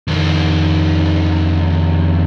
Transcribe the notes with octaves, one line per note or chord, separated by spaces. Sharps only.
F2 D#3